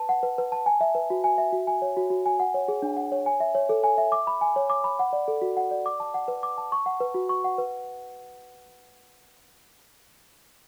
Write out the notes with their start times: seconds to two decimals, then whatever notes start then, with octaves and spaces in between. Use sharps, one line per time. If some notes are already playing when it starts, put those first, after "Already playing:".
Already playing: B4 A5
0.09 F#5
0.23 B4
0.38 B4
0.52 A5
0.66 G#5
0.81 E5
0.95 B4
1.10 F#4
1.24 G#5
1.38 E5
1.53 F#4
1.67 G#5
1.82 C#5
1.97 F#4
2.10 F#4
2.26 G#5
2.40 F#5
2.54 C#5
2.68 G#4
2.82 D4
2.97 F#5
3.12 C#5
3.26 G#5
3.40 E5
3.55 C#5
3.69 A4
3.84 G#5
3.98 E5
4.12 D6
4.27 B5
4.41 G#5
4.56 C#5
4.70 D6
4.84 B5
4.99 F#5
5.13 D5
5.28 A4
5.42 F#4
5.57 F#5
5.71 D5
5.86 D6
6.00 A5
6.14 F#5
6.28 B4
6.43 D6
6.58 A5
6.72 C#6
6.86 F#5
7.00 B4
7.14 F#4
7.29 C#6
7.44 F#5
7.58 B4